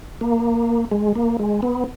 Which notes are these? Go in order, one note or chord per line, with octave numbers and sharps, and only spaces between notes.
A#3
G#3
A#3
G#3
B3